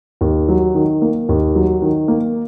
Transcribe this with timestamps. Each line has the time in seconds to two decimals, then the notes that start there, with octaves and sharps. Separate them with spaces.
0.21 D#2
0.48 F#3
0.75 D#3
1.02 A#3
1.29 D#2
1.55 F#3
1.82 D#3
2.08 A#3